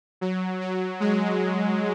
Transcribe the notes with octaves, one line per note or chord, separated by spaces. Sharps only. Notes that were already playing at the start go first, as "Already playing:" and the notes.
F#3
F#3
G#3